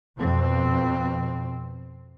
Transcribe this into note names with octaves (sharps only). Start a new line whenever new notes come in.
F2 B2 C4